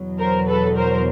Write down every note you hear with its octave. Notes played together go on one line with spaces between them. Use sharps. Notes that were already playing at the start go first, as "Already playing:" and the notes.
Already playing: E2 B2 F#3
A#4 C5
A4 B4
A#4 C5